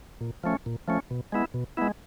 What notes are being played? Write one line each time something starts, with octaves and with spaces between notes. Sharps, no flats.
A#2
F3 A3 C#4
A#2
F3 A3 C#4
B2
G#3 B3 E4
B2
G#3 B3 E4